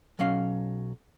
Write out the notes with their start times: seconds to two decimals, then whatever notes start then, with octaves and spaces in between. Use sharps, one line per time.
0.19 B1 F#3 C#4 F5